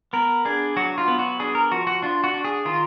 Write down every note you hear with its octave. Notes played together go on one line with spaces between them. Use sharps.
B3 A#4
D4 G#4
F#3 F#4
F4
B3
F#4
D4 G#4
A#4
F3 F#4
F#4
D4 F4
F#4
D4
G#4
D#3 F4